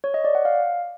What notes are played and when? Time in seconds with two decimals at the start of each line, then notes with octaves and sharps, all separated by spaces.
0.04 C#5
0.14 D#5
0.24 D5
0.35 F#5
0.45 F5